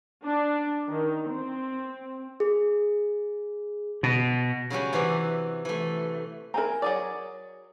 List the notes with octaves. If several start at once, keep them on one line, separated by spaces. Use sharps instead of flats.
D4
D#3
C4
G#4
B2
C#3 F#3 G3 C#4
C3 E3 F#4 D5
E3 A3
C4 E4 A#4 G#5 A#5
F#3 G#4 D5